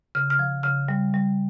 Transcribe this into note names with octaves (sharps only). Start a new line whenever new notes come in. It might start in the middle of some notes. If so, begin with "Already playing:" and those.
C#3 F6
F6
F3
C#3 F6
G3
G3